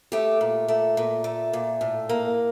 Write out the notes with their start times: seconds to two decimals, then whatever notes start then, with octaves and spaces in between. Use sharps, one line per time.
0.12 A3 G4
0.41 A#2
0.68 A3
0.97 A#2
1.24 A3
1.53 A#2
1.81 A2
2.09 A#3